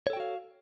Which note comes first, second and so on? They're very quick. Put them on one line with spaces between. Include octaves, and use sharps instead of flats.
C#5 A4 G5 F#4 F5